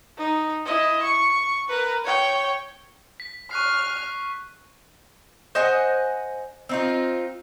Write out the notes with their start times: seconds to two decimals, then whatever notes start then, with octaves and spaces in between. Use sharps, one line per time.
0.18 D#4
0.65 E4 D#5
1.02 C#6
1.68 A#4 B4
2.04 C#5 G5
3.20 B6
3.51 C#6 F6 F#6 C7
5.55 C5 D#5 F#5 G#5
6.69 C4 D#4 F4